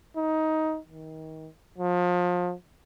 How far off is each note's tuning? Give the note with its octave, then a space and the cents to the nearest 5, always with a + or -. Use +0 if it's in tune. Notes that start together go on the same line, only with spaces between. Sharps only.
D#4 +15
D#3 +30
F3 +30